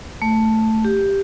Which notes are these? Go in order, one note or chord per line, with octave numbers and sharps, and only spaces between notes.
A3
G4